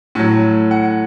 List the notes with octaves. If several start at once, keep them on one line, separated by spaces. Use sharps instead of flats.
A2 F#3
F#5